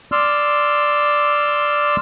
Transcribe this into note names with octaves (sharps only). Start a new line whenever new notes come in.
D5 C6 E6 F6